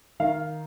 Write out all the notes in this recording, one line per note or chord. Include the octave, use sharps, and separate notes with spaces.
D#3 F5